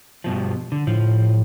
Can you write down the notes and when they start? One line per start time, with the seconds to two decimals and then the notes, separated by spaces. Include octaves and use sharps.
0.24 G2 B2 F3
0.72 D3
0.87 A2 F3